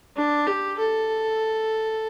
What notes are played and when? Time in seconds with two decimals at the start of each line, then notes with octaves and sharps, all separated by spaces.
0.16 D4
0.47 G4
0.79 A4